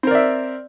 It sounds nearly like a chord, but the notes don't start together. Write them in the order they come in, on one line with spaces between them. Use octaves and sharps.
C4 A#4 D5 E5